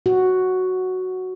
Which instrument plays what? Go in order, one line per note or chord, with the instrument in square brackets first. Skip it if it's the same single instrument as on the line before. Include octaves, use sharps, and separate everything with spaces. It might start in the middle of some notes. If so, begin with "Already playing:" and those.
[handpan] F#4